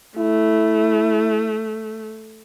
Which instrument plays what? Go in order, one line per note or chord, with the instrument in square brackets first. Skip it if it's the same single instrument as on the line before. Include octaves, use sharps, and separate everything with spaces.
[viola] A3 [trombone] E4